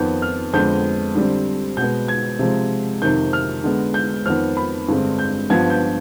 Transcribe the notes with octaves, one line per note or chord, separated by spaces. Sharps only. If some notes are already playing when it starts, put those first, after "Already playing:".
Already playing: F2 D#3 B3 G6
F6
F2 D3 G#3 B3 G6
D3 G3 C4
B2 G#3 B3 G6
G#6
C3 F3 G#3
F2 C3 D#3 G6
F6
D3 G#3 B3
G6
F2 D#3 B3 F6
B5
G2 D3 G#3 C4
G6
G2 F3 B3 G#6
G6